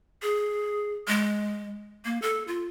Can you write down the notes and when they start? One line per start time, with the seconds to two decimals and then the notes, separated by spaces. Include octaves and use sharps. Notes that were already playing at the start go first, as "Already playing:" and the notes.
0.22 G#4
1.08 G#3
2.05 A#3
2.22 A4
2.48 F4